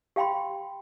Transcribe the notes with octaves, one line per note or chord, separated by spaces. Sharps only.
G4 F5 G5 B5 C6